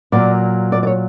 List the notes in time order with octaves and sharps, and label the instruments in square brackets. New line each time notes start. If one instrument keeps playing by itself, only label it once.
[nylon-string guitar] A#2 F#3 A#3 D5
D5
D5
C#5